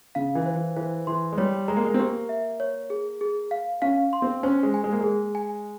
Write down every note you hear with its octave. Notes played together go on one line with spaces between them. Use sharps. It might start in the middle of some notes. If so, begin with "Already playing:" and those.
C#3 F5
E3
C5
E3
E3 C5
E3 C6
G#3
G3 C#5
G#3 A#5
A#3
G#3
C4
A#3 G4
E5
C#5
G#4
G#4
F5
C#4 F5
C6
C4
C#4 C5
G#3
G#5
G#3
A#3
G#3 G#4
G#5